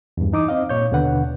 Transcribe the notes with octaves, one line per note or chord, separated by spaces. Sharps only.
E2 G2
E3 D#4 D6 D#6
C4 D#5 F5
A#2 C#5 G6
D#2 B2 D3 D4 B4 F#5